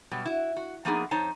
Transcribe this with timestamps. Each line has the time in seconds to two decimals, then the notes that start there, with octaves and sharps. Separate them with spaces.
0.11 B2 F#3 G3
0.26 E4 F#4
0.56 F#4
0.85 F3 A#3 B3 D4 D#4 G#4
1.11 F2 D#4 C5 C#5 A5